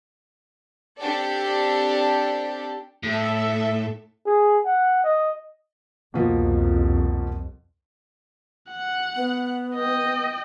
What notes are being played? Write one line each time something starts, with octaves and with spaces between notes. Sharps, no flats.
C4 D4 G4 A4 D5
A2 A4 E5
G#4
F#5
D#5
C2 F2 B2 F3 A#3
F#5
B3
D#5 G5